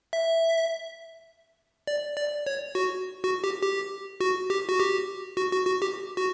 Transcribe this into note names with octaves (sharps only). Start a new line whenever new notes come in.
E5
D5
D5
C#5
F#4
F#4
G4
G4
F#4
G4
F#4
G4
F#4
F#4
F#4
G4
F#4